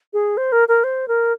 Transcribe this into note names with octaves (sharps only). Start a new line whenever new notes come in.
G#4
C5
A#4
A#4
C5
A#4